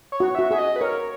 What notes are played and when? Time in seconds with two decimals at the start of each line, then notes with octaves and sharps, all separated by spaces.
0.12 C#5
0.20 F#4
0.35 F#4 E5
0.51 G#4 E5
0.58 D#5
0.76 B4
0.81 A#4 C#5